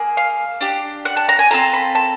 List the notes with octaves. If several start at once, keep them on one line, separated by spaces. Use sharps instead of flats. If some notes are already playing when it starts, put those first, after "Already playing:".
Already playing: A#3 G#4
F5
D4 G4
F#5
A5
A#5
G#5
C4 F4 A4 A#5
B5
A5